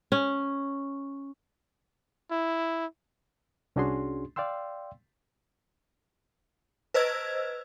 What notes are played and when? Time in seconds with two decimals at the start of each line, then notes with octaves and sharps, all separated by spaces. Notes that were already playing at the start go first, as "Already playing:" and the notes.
0.12 C#4
2.31 E4
3.76 C2 C#4 D4 F#4 G#4 C6
4.36 D5 F5 G5 C6 E6
6.94 B4 C5 D#5 E6 G#6